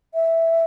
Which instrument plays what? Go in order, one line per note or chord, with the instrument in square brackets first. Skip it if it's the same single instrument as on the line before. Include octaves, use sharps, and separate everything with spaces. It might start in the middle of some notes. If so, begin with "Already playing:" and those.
[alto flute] E5